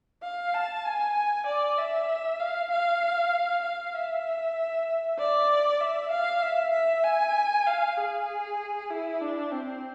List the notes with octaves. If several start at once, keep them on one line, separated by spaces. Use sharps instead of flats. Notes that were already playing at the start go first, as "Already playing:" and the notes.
F5
A5
G#5
D5
E5
F5
F5
F5
E5
D5
E5
F5
E5
E5
G#5
F5
G#4
E4
D4
C4